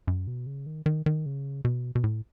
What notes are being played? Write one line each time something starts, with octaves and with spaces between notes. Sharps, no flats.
F#2
B2
C#3
D#3
D#3
D#3
C#3
B2
B2
A2